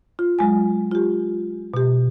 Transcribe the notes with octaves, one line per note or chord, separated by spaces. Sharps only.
F4
F#3 G#3 G#5
F4 G4
B2 G4